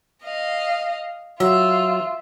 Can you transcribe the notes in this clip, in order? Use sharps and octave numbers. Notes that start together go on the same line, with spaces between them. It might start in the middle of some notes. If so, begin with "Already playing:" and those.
D#5 F5
F#3 F4 E5